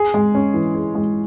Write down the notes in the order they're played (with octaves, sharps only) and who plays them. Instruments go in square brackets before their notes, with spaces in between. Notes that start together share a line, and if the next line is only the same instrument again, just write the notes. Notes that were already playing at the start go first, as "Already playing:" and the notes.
Already playing: [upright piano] G#4
G#3
C#4
E3
G#4
G#3